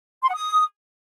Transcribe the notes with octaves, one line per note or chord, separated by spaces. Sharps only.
C6
F#5
D#6